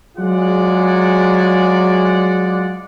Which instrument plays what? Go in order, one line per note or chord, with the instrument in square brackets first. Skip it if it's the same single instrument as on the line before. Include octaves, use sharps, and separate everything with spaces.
[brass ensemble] F#3 G#3 F4 G#4 D5 F#5